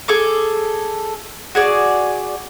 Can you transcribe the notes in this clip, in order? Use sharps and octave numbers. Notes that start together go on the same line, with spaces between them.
G#4 A4 D6
F#4 G#4 D5